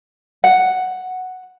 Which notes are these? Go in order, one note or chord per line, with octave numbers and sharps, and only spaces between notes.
F#5